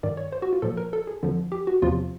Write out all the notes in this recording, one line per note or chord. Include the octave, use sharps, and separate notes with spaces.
G2 D#3 D5
C#5
C5
F#4
F4
A#2 F3 A4
A#4
A4
G#4
F2 D3 F3
G4
F#4
E2 C3 F3 F4